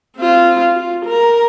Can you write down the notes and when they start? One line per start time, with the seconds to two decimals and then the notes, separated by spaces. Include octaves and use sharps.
0.17 C4 F4
0.75 F4
1.06 A#4